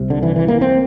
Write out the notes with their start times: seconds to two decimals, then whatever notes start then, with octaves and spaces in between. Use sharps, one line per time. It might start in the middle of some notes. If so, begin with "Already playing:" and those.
Already playing: C2 C3
0.10 D3
0.23 E3
0.36 E3
0.48 A#3
0.61 C4